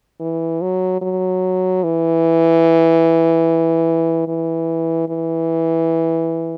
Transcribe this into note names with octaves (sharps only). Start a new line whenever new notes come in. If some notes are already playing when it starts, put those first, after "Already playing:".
E3
F#3
F#3
E3
E3
E3